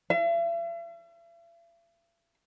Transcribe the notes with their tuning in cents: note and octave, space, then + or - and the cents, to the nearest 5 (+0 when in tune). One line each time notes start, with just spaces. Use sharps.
E5 +45